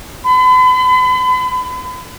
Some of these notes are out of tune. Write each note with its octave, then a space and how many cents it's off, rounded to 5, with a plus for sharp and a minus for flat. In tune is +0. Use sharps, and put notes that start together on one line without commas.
B5 +40